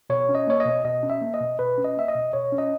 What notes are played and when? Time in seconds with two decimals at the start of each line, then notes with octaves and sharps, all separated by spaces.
0.10 B2 C#5
0.29 C#4
0.35 D#5
0.47 A#3 C#5
0.60 D#5
0.66 B2
0.85 B2 D#5
1.03 C#4
1.10 E5
1.22 A#3
1.34 D#5
1.41 B2
1.59 B2 B4
1.78 C#4
1.84 D#5
1.97 A#3 E5
2.08 D#5
2.15 B2
2.33 B2 C#5
2.52 C#4
2.58 D#5